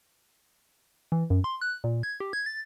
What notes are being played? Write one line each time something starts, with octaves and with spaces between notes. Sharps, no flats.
E3
F#2
C6
F#6
A#2
G#6
G4
G#6
A6